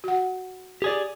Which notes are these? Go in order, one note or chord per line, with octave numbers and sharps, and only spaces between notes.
F#4 F#5
G4 G#4 D5